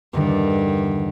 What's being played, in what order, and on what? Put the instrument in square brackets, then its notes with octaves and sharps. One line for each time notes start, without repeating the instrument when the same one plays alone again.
[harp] E2 D3 D#3 [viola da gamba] G2